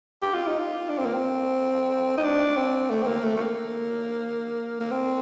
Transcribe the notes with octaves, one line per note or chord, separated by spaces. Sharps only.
G4
F4
D#4
F4
D4
C4
A#3
C4
D#4
D4
C4
A3
C4
A#3
A3
A3
A#3
A#3
C4